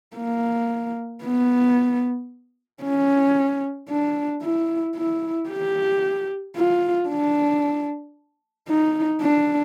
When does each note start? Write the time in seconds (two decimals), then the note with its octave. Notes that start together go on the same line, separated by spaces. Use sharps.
0.17 A#3
1.24 B3
2.83 C#4
3.89 D4
4.43 E4
4.96 E4
5.50 G4
6.56 F4
7.09 D4
8.69 D#4
9.22 D4